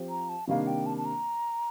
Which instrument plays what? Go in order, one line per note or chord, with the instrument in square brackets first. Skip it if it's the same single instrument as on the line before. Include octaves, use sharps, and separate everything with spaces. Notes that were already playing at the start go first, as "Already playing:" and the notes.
Already playing: [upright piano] F3 C4 G4
[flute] A#5
A5
[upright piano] C3 D#3 G3 A#3 D4 [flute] F5
[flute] G5
A5
A5
A#5